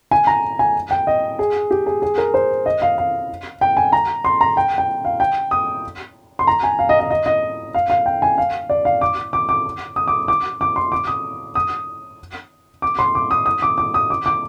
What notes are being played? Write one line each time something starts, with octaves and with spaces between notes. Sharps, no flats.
G#5
A#5
G#5
G5
D#5
G#4
G4
G#4
G#4
A#4
C5
D#5
F5
F5
G5
G#5
A#5
C6
A#5
G5
G5
F5
G5
D#6
C6
A#5
G#5
F5
D#5
D#5
D#5
D#5
F5
F5
G5
G#5
F5
D5
F5
D6
D6
D6
D#6
D6
D6
D6
C6
D6
D#6
D#6
D6
C6
D6
D#6
D#6
D6
D6
D#6
D6
D6